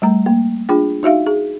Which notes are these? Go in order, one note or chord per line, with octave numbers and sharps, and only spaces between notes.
G3 A3 A#5
A#3
D4 F4 G#4 G5
D#4 F#4 E5 F5
G#4